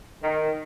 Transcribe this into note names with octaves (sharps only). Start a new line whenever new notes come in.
D#3